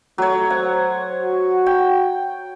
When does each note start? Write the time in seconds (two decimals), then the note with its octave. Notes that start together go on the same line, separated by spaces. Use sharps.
0.18 F#3 A3 C#5
0.50 C5 F#5
1.22 F#4
1.66 G5